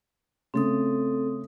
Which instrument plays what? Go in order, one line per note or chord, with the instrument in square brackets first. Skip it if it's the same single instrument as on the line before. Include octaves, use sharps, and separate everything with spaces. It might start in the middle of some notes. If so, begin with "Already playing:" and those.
[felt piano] C#3 A3 [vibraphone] C4 A4 D#6